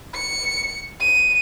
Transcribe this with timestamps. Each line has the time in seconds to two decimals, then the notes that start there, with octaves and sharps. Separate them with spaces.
0.15 C#7
1.00 D#7